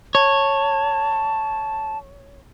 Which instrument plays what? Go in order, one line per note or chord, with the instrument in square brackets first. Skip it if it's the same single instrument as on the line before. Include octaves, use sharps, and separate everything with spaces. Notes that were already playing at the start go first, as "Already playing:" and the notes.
[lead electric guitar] C#5 [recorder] A5